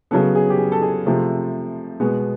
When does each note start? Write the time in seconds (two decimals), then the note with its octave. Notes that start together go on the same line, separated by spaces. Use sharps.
0.11 C#3 F#3 B3 A4
0.35 G#4
0.50 G4
0.58 G#4
0.72 A4
0.82 G#4
1.06 C3 F3 A3
2.00 B2 G#3 B3